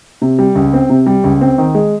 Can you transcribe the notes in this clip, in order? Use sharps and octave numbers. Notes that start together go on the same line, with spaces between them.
C3
G3
C#2
C4
C3
G3
C#2
C4
D#3
G#3